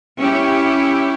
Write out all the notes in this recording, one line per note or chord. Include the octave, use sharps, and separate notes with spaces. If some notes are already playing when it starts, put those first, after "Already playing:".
C#4 E4 G4